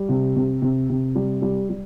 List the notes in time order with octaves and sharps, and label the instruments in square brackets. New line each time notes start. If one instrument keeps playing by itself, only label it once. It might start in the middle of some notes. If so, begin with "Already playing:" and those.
Already playing: [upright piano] G3
C3
C3
C3
C3
G3
G3
G3